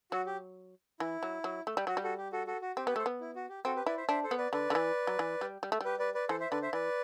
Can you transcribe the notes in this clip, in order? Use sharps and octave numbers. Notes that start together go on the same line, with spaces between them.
F#3 F#4
G4
E3 E4
F#3
F#3
A3
G3
F#3 F#4
G3
F#4 A4
G4
F#4 A4
F#4 A4
F#4
C4 G4
B3 G4 B4
A3 A4 C5
B3
E4
F#4
G4
C4 F#4 A4
G4 B4
E4 B4 D5
C5 E5
D4 C5 E5
A4 C5
B3
B4 D5
D3 B4 D5
D3
E3
F#3
E3
G3
G3
A3
G3 G4 B4
B4 D5
B4 D5
E3 A4 C5
C5 E5
D3 B4 D5
C5 E5
E3 B4 D5